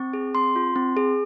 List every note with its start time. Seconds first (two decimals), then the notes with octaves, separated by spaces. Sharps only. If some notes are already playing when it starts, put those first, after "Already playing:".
Already playing: C4 C#6
0.13 G#4
0.35 C4 C6
0.56 F4
0.76 C4
0.97 G#4